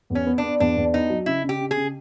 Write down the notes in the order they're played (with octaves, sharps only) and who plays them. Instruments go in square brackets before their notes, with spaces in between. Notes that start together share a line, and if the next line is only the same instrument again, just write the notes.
[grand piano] E2
[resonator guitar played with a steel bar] C#4
[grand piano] B3
[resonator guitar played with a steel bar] D4
[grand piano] B3
[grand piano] E2 [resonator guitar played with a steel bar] D4
[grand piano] E2
[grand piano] B3 [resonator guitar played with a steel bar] D#4
[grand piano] F#3
[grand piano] C#3 [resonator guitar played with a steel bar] E4
[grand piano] C#3
[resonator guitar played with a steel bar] G4
[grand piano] C#3
[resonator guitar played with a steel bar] G#4
[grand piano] C#3